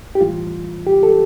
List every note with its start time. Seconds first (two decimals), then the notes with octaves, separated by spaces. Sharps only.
0.15 G4
0.21 A2 E3 G3 F4
0.87 G4
1.03 A4